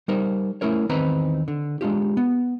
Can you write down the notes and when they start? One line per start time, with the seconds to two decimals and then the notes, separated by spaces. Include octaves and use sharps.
0.08 G3 D#4 A#4 C5
0.61 A3 C#4 E4 A#4 C#5
0.89 E2 D#3 C4 D#4 B4 A#5
1.48 D3
1.81 G#3 D4 F4 G4
2.17 B3